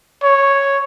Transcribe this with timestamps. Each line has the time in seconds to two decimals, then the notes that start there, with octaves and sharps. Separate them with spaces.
0.23 C#5